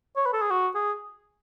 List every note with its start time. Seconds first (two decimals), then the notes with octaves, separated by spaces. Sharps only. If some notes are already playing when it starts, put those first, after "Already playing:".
0.16 C#5
0.25 B4
0.33 A4
0.41 G#4
0.50 F#4
0.75 G#4